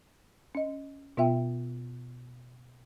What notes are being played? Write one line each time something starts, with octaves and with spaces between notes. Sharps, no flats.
C#4 D#5
B2 B3 F4 E5 G5